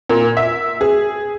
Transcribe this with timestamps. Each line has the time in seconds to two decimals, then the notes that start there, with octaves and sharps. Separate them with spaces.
0.10 A#2
0.37 E5
0.81 G#4